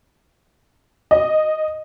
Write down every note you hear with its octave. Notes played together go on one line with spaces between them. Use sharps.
D#5